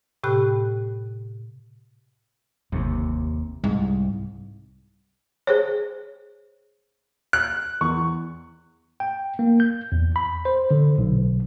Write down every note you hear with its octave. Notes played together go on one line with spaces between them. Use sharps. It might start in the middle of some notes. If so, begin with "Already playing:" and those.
A2 C3 G4 G5 B5 F#6
G1 D#2 C3
C2 G#2
G#4 C5 C#5
F#6
E2 C#6
G5
A#3
G6
E2
B5
C5
D3
B1